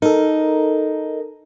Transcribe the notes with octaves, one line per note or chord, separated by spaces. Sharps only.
D#4 A4 A#4